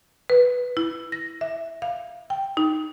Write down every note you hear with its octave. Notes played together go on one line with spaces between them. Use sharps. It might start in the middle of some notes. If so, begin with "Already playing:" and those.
B4
E4
A#6
E5
F5
G5
D#4